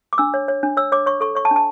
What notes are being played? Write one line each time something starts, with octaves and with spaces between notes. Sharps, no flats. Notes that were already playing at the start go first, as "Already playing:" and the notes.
D6
D4 E6
C#5
C#5
D4
C#5 E6
C#5 D6
C#5 C#6
A4 C#6
C#5 C#6
A5
D4
A5